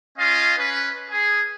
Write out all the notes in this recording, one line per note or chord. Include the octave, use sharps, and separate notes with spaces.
C#4 F4 D#5 F5
C#4 B4
G#4